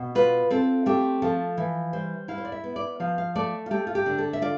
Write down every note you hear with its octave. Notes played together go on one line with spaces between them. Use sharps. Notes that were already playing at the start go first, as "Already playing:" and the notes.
Already playing: B2
F4 B4
C4 A4
A3 G4
F3 A4
E3
G3 C5
E4 F5
C5
D5
E5
B3
D5
F3 F5
F5
A3 D5
F4
A3 G4
F4
G4
D3
A4
E5
F4 D5